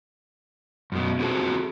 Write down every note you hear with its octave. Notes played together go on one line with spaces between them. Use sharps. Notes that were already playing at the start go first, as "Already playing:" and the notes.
F#2 B2
C4 F#4 G#4 A4